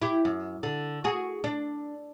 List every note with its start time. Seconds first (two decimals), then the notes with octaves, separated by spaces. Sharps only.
0.02 E4 G4
0.25 F#2
0.63 D3
1.04 F#4 G#4
1.44 D4